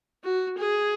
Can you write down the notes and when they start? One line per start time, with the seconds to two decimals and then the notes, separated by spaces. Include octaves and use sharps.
0.23 F#4
0.58 G#4